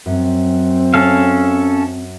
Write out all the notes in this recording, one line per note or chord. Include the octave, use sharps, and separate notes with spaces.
F#2 C4
C#4 A4 F5